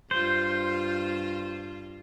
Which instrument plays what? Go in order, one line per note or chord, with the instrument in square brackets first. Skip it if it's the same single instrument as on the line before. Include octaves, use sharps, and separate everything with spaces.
[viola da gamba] G2 F4 [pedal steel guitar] C5